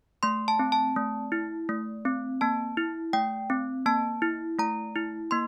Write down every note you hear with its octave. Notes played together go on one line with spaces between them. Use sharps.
A3 C6
A5
C4
A5
A3
E4
A3
C4
A#3 A5
E4
A3 G5
C4
A#3 A5
E4
A3 A#5
E4
A#3 C6